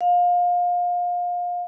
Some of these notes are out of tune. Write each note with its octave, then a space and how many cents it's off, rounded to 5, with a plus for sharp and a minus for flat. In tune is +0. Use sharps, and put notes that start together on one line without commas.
F5 +25